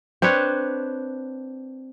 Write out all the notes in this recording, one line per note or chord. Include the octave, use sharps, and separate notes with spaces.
C4 D4 B4 C#5